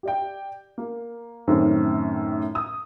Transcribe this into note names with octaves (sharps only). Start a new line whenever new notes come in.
G4 D5 G5
A#3
F#2 A2 D#3 A3 C4 C#4
D#6